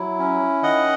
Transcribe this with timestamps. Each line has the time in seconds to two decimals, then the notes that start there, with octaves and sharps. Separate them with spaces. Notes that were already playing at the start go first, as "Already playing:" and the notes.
Already playing: F#3 E4
0.19 C#4
0.63 D#3 D#5 F#5